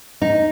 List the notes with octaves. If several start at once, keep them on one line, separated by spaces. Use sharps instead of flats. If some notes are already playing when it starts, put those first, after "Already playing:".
D#4